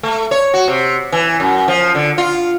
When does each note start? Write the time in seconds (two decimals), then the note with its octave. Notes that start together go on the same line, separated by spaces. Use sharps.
0.03 A3
0.31 C#5
0.54 F#4
0.68 C3
1.12 E3
1.40 F#2
1.68 F3
1.95 D3
2.18 F4